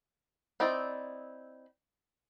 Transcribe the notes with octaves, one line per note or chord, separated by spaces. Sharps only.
C4 D#4 E4 D5